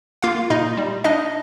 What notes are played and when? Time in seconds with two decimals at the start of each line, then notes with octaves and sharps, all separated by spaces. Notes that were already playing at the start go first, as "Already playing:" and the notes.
0.22 A#3 F4 F5
0.50 A#2 D#4 D#5
0.77 G3
1.04 D4 D#4 D#5